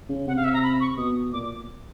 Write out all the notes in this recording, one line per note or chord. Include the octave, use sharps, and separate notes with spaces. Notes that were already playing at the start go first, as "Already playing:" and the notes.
C#3
C3 F#5
F5
E5
A#5
B5
C#6
B2 D#6
A#2 D6